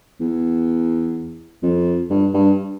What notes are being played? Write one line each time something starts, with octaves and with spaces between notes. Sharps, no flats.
E2
F2
G2
G2